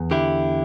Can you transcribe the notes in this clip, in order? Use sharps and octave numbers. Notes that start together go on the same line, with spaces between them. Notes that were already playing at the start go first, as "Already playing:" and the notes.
Already playing: E2
D3 E4 G4